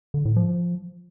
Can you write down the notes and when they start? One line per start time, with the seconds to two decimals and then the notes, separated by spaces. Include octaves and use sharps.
0.14 D3
0.25 A2
0.36 F3